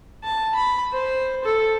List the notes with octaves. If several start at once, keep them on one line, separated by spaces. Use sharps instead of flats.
A5
B5
C5
A4